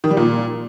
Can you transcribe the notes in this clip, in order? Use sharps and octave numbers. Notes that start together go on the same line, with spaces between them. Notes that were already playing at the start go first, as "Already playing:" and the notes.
D#3
G3
A#2